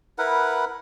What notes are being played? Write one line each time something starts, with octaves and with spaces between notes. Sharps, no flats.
E4 A#4 B4 F#5